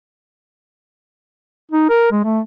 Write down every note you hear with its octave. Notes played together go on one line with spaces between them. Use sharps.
D#4
A#4
G#3
A3